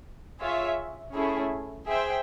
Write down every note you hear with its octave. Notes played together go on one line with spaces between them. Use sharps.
F4 G#4 C#5 E5
A3 C#4 E4 G#4
G#4 C5 E5 G5